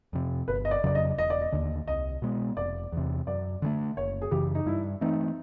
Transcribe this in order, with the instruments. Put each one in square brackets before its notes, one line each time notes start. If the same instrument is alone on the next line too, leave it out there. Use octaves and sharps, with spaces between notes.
[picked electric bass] F2 C3
[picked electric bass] G1 [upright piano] B4
[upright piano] D#5
D5
[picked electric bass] F2 C#3 F#3 [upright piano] D5
[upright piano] D#5
[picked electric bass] E1 [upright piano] D#5
[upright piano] D5
D#5
[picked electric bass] D#2 D3
[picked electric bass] C2 [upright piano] D#5
[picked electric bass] B2 G#3 B3
[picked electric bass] F1 [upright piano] D5
[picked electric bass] E2 C3
[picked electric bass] F#2 [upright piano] D5
[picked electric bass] D3 F3 A3
[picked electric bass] F#1 [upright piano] C#5
[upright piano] G#4
[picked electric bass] F#2 C#3 E3 [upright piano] G4
[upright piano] D#4
[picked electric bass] G2 [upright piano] E4
[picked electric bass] E3 A3 C4 [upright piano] D#4